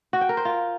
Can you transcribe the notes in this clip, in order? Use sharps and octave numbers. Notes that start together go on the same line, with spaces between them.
F#4
G5
A#4
C5
F4